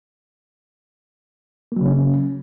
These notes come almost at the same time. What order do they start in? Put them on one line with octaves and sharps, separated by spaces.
A#3 F#3 C#3 C#4